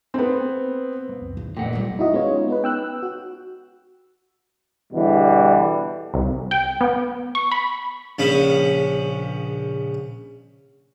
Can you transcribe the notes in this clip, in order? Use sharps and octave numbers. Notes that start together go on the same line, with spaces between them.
B3 C4
G#3 A#3 C4
C#2 F#2
E2 D#3
F1 F2 A#2 A3 F#5 G5
G3 D#4
D#4 E4 F#4 D#5
G#3 B3 C#4 D#4 F4 C#5
B3 D#4 B4
G5 E6 F#6
E6
F#4
E2 B2 D3 E3 G3
C2
G5
B3
C#6
B5
A#1 C#3 C#4 B5